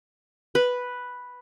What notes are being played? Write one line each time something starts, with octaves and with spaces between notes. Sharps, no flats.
B4